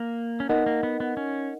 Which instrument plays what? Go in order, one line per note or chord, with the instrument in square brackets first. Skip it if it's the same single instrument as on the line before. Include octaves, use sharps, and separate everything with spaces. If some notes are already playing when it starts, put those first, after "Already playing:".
Already playing: [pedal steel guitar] A#3
C#4
[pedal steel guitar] B3 [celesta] D#4 A#4 D#5 F#5
[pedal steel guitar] A#3
B3
B3
C#4